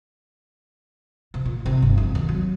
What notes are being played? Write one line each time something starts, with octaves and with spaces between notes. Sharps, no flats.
C3
A#2
C3
G1
F2
D#2
F#3